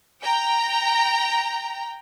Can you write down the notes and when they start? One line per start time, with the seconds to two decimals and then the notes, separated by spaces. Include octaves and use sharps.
0.23 G5 A#5